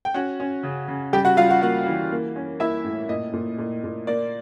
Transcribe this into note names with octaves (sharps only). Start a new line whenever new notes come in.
G5
C#4 F#4 F#5
C#4
C#3
C#3
G3 G4 G5
F#4 F#5
G3 F4 F5
F#4 F#5
A#3 F#4 F#5
E3
A#3
C#4
A#3 E4 E5
A2
A#2 D#5
A#2
A#2
A#2
A#3 D5